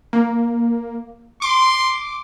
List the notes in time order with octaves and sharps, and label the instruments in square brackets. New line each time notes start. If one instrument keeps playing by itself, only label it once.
[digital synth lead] A#3
[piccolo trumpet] C6 [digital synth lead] D6